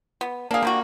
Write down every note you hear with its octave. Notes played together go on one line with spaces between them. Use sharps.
B3
A#3 D4 G#4 F5
D3 G3 A#3 F#4